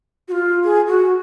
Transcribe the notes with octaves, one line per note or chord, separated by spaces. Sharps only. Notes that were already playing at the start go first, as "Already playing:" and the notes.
F#4
F4
G#4
F#4